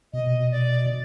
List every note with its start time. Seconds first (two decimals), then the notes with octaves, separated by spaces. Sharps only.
0.13 B2 D#5
0.51 D5